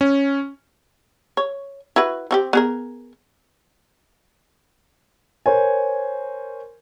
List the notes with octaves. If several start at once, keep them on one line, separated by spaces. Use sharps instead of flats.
C#4
C#5
E4 F#4 B4
C4 F#4 G4
B3 G#4 A#4
A#4 C5 C#5 G#5